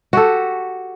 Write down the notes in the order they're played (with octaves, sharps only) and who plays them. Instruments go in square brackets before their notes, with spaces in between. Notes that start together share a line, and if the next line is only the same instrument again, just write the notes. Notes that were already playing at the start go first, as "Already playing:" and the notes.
[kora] F#4 G4 A4